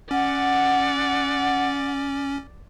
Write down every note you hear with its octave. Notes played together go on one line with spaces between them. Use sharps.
C#4 D5 F#5